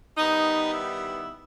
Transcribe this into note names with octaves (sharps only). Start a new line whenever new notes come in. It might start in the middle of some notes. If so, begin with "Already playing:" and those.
D#3 G3 B3 D#4
E4